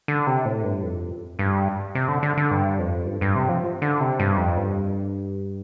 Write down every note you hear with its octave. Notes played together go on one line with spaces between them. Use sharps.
D3
C3
A2
G2
F2
G2
C3
D3
D3
D3
G2
F2
G2
G2
C3
F3
D3
C3
G2
F2
G2